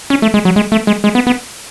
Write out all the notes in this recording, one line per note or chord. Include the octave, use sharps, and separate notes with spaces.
C#4
A3
G#3
F#3
G#3
A3
G#3
G#3
B3
B3